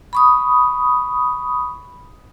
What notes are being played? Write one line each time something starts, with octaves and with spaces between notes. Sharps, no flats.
B5 C#6 D#6